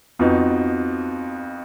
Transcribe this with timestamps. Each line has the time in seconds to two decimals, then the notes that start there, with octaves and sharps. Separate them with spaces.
0.19 F2 F3 B3 D#4 F#4